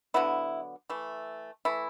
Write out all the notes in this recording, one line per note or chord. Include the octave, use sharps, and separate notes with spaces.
D3 F#3 B3 E4
E3 A3
E3 A3 E4